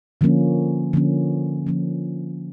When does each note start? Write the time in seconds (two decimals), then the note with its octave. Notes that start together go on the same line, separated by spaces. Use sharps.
0.21 D3 F3 A#3 C#4
0.93 D3 F3 A#3 C#4
1.67 D3 F3 A#3 C#4